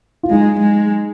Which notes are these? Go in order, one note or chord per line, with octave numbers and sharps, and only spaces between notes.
F4
G#3 D#4
G#3